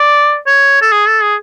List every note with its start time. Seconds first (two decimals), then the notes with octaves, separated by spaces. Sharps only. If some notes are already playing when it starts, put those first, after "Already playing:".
Already playing: D5
0.47 C#5
0.82 A4
0.92 G#4
1.07 A4
1.22 G#4